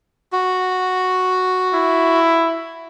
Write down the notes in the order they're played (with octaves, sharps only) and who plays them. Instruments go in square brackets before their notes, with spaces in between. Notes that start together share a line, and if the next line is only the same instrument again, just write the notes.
[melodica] F#4
[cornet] E4